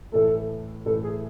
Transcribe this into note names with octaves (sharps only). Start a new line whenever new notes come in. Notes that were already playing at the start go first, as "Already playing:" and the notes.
A2 E3 A3 A4
A2 E3 A3 A4
G#4